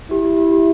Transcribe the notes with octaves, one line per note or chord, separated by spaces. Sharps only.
E4 G4
G4